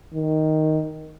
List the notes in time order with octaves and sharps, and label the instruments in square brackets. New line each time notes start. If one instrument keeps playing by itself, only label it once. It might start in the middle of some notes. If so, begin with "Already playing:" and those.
[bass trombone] D#3